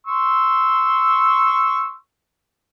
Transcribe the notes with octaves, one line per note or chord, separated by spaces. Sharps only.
C6 C#6 E6